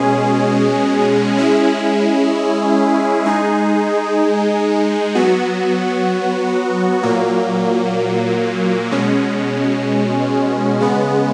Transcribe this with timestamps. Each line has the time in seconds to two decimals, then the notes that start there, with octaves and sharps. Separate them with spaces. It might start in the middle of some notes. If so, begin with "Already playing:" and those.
Already playing: B2 G#3 C#4 G#4
1.37 G#3 C#4 E4 G#4
3.26 G#3 D#4 G#4
5.15 F#3 B3 F#4
7.03 A#2 F#3 A#3
8.91 B2 G#3 C#4
10.80 C#3 G#3 B3